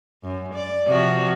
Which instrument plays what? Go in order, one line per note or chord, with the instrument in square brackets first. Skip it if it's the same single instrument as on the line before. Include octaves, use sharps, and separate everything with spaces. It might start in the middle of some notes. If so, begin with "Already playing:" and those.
[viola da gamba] F#2
D5
C3 F3 F#4